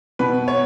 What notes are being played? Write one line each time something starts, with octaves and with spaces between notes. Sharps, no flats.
B2 B4
C#5